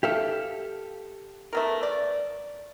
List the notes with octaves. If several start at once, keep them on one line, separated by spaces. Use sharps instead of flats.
G4 A4 E5 F5 G5
A3 B3 A#4
D5